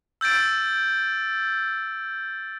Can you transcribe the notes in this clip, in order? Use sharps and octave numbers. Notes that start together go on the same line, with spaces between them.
E6 G6 A6 D7